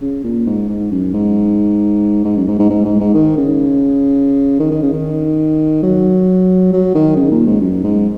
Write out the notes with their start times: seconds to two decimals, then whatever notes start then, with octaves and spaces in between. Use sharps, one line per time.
0.01 C#3
0.24 A#2
0.46 G#2
0.69 G#2
0.92 F#2
1.14 G#2
2.25 G#2
2.37 F#2
2.48 G#2
2.59 G#2
2.70 G#2
2.85 G#2
3.00 G#2
3.15 D#3
3.37 C#3
4.60 D#3
4.71 D#3
4.82 C#3
4.93 D#3
5.83 F#3
6.73 F#3
6.95 D#3
7.16 C#3
7.31 A#2
7.46 G#2
7.61 F#2
7.84 G#2